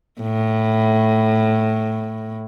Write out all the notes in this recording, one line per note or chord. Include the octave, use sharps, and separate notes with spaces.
A2